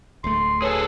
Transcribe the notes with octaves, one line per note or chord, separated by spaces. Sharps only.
D1 D2 A3 C6
G#4 A4 B4 C#5 G#5